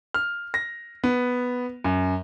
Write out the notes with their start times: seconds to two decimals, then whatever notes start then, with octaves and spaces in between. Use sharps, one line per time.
0.14 F6
0.54 A#6
1.04 B3
1.84 F#2